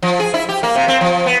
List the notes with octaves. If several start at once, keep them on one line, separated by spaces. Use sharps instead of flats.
F3
G#4
E4
G4
A#3
C3
C4
F3
B3